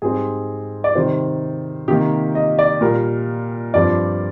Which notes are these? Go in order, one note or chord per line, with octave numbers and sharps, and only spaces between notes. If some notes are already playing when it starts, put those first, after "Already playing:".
G#2 G3 C4 G#4
D5
C3 D#3 G3 C5
C3 D#3 A#3 G4
D#5
D5
A#2 G3 A#3 A#4
G2 F3 C4 D5